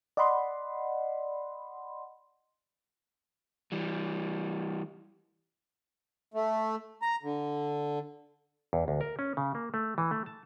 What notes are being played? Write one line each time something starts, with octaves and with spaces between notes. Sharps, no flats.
D5 D#5 F#5 B5 C6
E3 G3
A3
A#5
D3
E2
D2
A#4
C#4
C#3
A#3
A3
E3
A3
A5